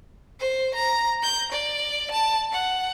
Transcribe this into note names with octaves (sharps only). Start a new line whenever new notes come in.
C5
A#5
G6
D5
A5
F#5